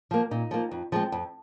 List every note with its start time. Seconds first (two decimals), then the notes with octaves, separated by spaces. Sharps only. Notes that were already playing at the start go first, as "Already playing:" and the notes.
0.11 F3 A#3
0.31 A#2 D#4
0.51 F3 A#3
0.71 F2
0.92 F3 G#3 C4
1.12 F2